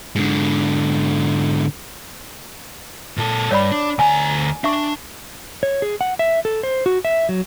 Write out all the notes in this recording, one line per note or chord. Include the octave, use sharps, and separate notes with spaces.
G#2 D3
A#2 A4
G2 C#5 D5 B5
D4
D2 G#5 A#5
D4 E5 C#6
C#5
G#4
F#5
E5
A4
C5
F#4
E5
F#3